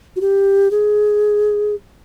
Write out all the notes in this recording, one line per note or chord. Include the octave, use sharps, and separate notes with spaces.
F#4
G4
G#4